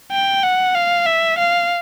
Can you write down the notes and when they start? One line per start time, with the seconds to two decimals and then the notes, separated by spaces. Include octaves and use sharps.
0.12 G5
0.43 F#5
0.75 F5
1.06 E5
1.38 F5